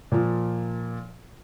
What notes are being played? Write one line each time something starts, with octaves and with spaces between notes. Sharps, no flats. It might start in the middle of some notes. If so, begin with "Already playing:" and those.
A#2 F3